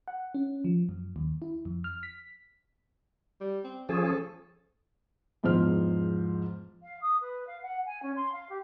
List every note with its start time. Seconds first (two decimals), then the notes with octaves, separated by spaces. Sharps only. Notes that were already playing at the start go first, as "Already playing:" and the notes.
0.08 F#5
0.34 C#4
0.64 F3
0.89 F#2
1.16 D#2
1.42 E4
1.65 F2
1.84 F6
2.03 B6
3.41 G3
3.64 C4
3.89 F3 C#4 G#4 A4
4.03 A4
5.43 E2 G#2 F3 C5 F6
6.82 F5
7.01 D#6
7.20 B4
7.47 F5
7.62 F#5
7.85 G#5
8.02 C#4
8.16 C6
8.32 F5
8.49 G4